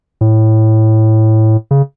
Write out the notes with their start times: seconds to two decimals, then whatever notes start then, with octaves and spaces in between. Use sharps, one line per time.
0.21 A2
1.71 C#3